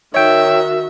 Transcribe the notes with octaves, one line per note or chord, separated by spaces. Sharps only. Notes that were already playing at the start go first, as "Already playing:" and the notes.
D#3 F#4 C#5 E5 G5